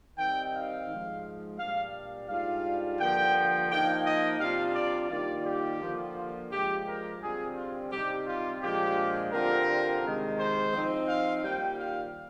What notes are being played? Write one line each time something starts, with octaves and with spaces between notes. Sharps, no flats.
D#3 G3 C4 D#4 G5
F5
G#2 F3 G#3
A#2 G3 D4 F5
G#2 G3 D4 F4 F5
G2 D3 F3 A#3 G5
F3 A#3 D#4 G5
D#5
C3 G3 D4 F4 F5
D5
D#3 G3 A#3 F4 D5
G4
D3 F3 A#3 F4
F4
G2 F3 G#3 G4
A#4
D3 G3 C4 F4 G#4
F4
C3 G3 C4 D#4 G4
F4
A#2 F3 G#3 D4 F4 G4
D3 G3 C4 F4 A#4
C3 D#3 G#3
C5
F3 C4 D#4
F5
D#3 G3 A#3 F4 G5
F5